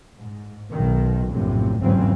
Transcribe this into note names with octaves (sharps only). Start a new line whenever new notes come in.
G#2
B1 D#3
A#1 F#2 A2 C3
G1 E2 G#2 C#3 F#3 C4